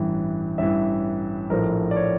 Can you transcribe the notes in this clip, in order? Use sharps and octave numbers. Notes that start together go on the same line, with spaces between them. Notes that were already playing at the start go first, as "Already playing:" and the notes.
Already playing: A1 G2 E3
A1 G2 E3 E5
A#1 A2 F3 A#4
D5
C#5